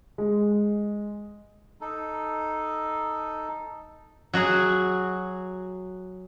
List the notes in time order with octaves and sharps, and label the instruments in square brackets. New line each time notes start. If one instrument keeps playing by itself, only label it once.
[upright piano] G#3
[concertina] D#4 A4
[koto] F#3 F#4 G#4